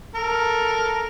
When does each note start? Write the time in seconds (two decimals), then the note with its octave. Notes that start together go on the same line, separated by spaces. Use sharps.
0.15 A4 A#4